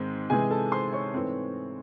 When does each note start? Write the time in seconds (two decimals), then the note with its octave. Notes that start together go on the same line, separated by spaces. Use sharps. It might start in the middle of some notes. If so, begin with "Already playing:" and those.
Already playing: G#2 D#3 G#3 C4
0.30 C3 E3 G#3 G#4 G#5
0.50 A4 A5
0.72 C5 C6
0.93 C#5 C#6
1.14 G#2 E3 A3 C4